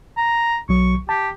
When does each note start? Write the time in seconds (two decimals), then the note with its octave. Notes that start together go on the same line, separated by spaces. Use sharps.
0.17 A#5
0.69 B1 F#3 C#6
1.09 G4 A5